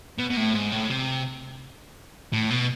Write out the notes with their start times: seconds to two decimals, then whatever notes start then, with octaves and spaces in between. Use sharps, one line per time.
0.19 B2
0.30 B2
0.37 A2
0.54 G#2
0.72 A2
0.90 C3
2.33 A2
2.50 B2